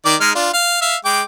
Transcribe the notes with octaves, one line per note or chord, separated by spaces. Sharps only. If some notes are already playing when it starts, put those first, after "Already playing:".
D#3 D5 D6
G#3 D#4 F6
D4 F4
F5
E5 F5
G#3 G5 D6